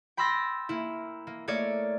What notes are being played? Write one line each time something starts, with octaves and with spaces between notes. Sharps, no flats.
G5 B5 C6 E6 A6 A#6
A#3 E4
A#3
A3 A#3 C#5 D5